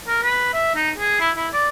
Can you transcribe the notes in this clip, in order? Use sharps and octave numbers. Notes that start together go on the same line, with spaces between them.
A#4
B4
E5
D#4
G#4
E4
E4
D5